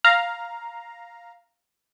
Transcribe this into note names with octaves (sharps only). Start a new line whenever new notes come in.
F5 A#5